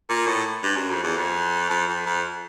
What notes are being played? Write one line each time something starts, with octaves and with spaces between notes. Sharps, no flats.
A#2
A2
G2
F#2
F2
E2
F2
F2
F2
F2